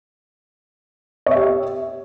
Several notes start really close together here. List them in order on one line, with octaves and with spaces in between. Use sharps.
C#5 E5 G4